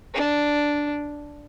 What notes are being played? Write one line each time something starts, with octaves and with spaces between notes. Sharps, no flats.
D4